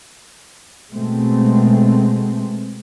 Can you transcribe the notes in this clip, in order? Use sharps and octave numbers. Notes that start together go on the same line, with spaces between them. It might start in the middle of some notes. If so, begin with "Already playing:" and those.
B2 G#3 A3 C4